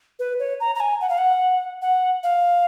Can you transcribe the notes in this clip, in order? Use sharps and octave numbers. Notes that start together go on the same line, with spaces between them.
B4
C#5
A#5
A#5
G#5
F#5
F5
F#5
F#5
F5